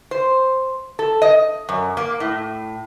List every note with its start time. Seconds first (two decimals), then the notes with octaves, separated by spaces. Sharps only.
0.11 C5
0.99 A4
1.22 D#5
1.69 F#2
1.97 A#3
2.20 A2